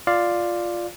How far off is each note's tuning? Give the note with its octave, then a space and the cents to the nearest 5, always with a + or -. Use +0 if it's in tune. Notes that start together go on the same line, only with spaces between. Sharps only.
F4 +0 D5 +5 F5 +0